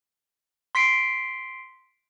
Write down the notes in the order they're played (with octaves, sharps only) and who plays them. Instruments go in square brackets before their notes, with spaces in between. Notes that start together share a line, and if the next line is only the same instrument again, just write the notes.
[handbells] C6 B6 C7 D7